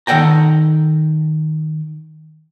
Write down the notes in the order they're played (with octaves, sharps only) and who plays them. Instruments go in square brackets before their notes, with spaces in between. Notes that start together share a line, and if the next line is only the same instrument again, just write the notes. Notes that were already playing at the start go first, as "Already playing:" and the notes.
[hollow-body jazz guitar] D#3 A4 D5 F#5 G5 A#5